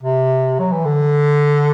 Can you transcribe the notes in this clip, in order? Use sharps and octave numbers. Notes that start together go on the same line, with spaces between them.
C3
F#3
E3
D3